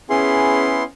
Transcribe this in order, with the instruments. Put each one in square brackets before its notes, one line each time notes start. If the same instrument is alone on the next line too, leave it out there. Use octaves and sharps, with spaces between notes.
[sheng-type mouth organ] B3 E4 C6 [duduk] C#4 [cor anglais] G#4